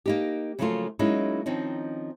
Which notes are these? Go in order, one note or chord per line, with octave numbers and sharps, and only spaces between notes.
A#3 D#4 G4
C#3 F3 F#3 A3 A#3 F4
F#3 G#3 A#3 C#4 D#4 E4
D#3 F3 C4 C#4 D#4